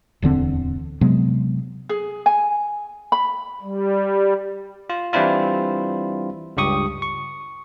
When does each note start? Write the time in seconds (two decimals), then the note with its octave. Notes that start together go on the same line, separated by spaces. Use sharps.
0.22 D1 E2 D3 C4
1.01 C3 F#3 G#3 B3
1.89 G#4
2.26 G#5
3.12 B5
3.62 G3
4.90 F4
5.13 E3 G3 C4 D4 E4 F4
6.57 C#2 G2 G4 C#6 D#6
7.02 C#6